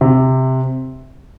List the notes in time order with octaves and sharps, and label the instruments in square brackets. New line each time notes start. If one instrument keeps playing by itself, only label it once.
[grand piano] C3